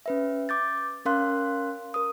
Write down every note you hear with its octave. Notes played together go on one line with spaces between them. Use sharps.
C#4 B4 E5
D6 G6 A6
C#4 A#4 F5 C6 F#6
A#4 D#6